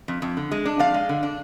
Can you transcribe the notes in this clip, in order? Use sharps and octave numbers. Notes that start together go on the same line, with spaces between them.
F2
F2
D3
G#3
D4
F2 D5 F5
G#3
D3
D4